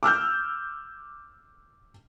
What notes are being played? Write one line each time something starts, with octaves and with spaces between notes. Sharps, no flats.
D6 E6 F6 G6